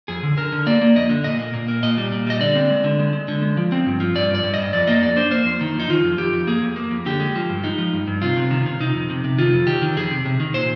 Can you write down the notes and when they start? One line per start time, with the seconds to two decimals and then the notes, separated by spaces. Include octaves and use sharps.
0.08 F2 G#4
0.23 D3
0.37 D3 A#4
0.52 D3
0.67 A#3 D5
0.81 A#3
0.96 F2 D#5
1.10 D3
1.24 A#2 D#5
1.39 A#3
1.54 A#2
1.68 A#3
1.83 A#2 D#5
1.97 G3
2.12 A#2
2.27 G3 D#5
2.40 D3 D5
2.55 C4
2.70 G#3
2.84 D3
2.99 G#3
3.13 G#3
3.28 D3
3.42 G#3
3.57 F3
3.72 C4
3.86 G2
4.00 F3
4.15 G2 D5
4.30 G2
4.35 D5
4.44 G2
4.54 G2 D#5
4.73 F2 D5
4.87 A#3 D#5
5.02 F2 D5
5.16 D4 C5
5.31 A#3 C5
5.46 F2
5.61 D#3
5.75 F2 D#4
5.89 D#3 F4
6.04 F2
6.18 F2 G4
6.33 F2
6.47 A#3 G#4
6.62 F2
6.76 A#3
6.91 F2
7.06 D3 G4
7.20 G#3
7.35 F3
7.50 G2
7.64 G#3 D#4
7.78 F3
7.93 G2
8.07 G2
8.22 C3 F4
8.37 C3
8.51 D#3
8.66 C3
8.80 C3 D#4
8.95 F2
9.10 C3
9.24 C3
9.38 D#3 F4
9.53 F2
9.67 D#3 G4
9.82 D#3
9.97 F2 G#4
10.11 C3
10.26 C3
10.40 D#3
10.54 A#2 C5